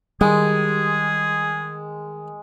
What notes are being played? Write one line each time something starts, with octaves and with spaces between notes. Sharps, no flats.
D#3 G3 G#3 G#4